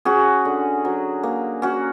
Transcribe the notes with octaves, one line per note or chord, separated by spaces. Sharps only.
C#4 F#4 G#4
D3
F#3
A#3
C#4 F#4